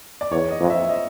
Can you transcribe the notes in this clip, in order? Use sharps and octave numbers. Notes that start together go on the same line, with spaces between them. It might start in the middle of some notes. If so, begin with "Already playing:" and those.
D5
E2 C#5
D#5
F2
E5
D#5